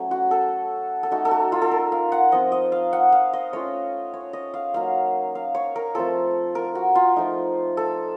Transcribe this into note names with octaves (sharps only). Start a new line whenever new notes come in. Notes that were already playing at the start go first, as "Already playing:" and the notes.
Already playing: F#3 A3 C#4
F#4
A4
A4
A3 D#4 F#4
A4
F#4
F4
A4
A#4
F5
F#5
F3 C4 F4 D#5
D#5
F5
F#5
F5
D#5
A3 C#4 F4 C#5
C#5
D#5
F5
F#3 A#3 D#4 F5
F5
C#5
A#4
F3 A3 C4 F4 A4
A#4
F#4
F4
F3 A3 D#4
A4